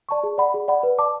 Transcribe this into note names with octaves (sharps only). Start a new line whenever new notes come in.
D5 A5 C#6
G#4
D5 F#5 B5
G#4
D5 F#5 B5
B4
D5 A5 D6